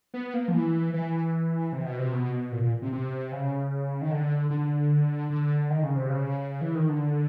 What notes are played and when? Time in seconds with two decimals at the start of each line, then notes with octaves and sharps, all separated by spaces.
0.14 B3
0.34 A#3
0.48 F3
0.53 E3
0.94 E3
1.73 C3
1.86 B2
1.99 C3
2.13 B2
2.52 A#2
2.62 A#2
2.82 C3
2.92 C3
3.32 C#3
4.02 D#3
4.11 D3
4.50 D3
5.30 D3
5.70 D#3
5.83 C#3
5.96 C3
6.09 C#3
6.61 E3
6.75 D#3
6.89 D3